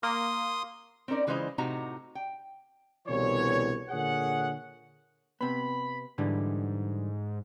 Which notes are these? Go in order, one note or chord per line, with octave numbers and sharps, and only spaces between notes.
A#3 C6 D#6
C4 C#4 D#4 A#4 D5
C#3 E3 G#3 F4 C5 D#5
A2 C3 D#4 F#4 A#5
G5
C2 B2 D3 E3 C#5
A#2 D3 G#4 C#5 F#5
C3 B3 B5
G#2 D3 E3 G3